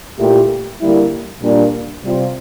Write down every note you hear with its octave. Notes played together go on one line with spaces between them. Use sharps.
A#2 A3 E4 G4
D3 G3 A#3 E4
A#2 G3 A#3 D4
C3 G3 C4 F4